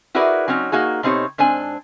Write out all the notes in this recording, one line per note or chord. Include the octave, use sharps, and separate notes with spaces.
E4 F#4 G#4 A#4 B4 D5
F#3 C4 C#4 D#4
A#3 D#4 F#4 G#4
B2 C4 D#4 G4 C#5
G#2 C4 D4 G#5